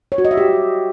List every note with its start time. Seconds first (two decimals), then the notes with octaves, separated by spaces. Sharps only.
0.12 C#5
0.18 F#4
0.25 D#5
0.31 E5
0.37 G4